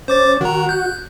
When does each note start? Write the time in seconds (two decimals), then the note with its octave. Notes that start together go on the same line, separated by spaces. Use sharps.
0.08 C#4 C5 D6 A6
0.41 D#3 F#4 A#5
0.69 F#6 G6